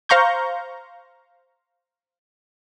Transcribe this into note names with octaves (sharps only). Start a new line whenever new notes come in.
C5 F5 A#5 C#6 G6